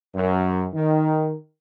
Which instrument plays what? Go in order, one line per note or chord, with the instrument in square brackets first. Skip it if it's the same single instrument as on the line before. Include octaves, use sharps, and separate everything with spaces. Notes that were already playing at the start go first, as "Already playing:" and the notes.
[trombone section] F#2
D#3